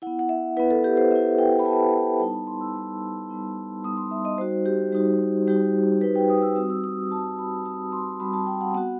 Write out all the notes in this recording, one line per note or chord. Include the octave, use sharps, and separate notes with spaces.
B3 E4 F#5
F#5
E5
B3 E4 B4
A4
G4
C5
B3 E4 E5
G5
B5
B3 E4 A5
G3 B3 D#4 A5
B5
C6
E6
G3 B3 D#4
G3 B3 D#4
G3 B3 D#4 D#6
C6
E5
D#5
G3 D#4 F#4 C5
G4
G3 D#4 F#4
G3 D#4 F#4 G4
G3 D#4 F#4 B4
G5
D#6
E6
G3 C4 F#4 D#6
E6
D#6
G3 C4 F#4 A5
B5
G3 C4 F#4 D#6
C6
G3 C4 F#4 B5
A5
G5
F#5
B3 F#4 F#5